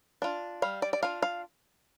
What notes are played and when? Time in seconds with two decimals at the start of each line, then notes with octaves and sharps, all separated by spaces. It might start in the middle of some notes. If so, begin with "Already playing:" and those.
0.22 D4 F4
0.62 G3 F5
0.82 D5
0.93 D5
1.03 D4 F4 F5
1.22 F5